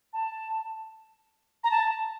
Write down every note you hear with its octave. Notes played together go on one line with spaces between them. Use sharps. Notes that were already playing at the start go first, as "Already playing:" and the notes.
A5
A#5
A5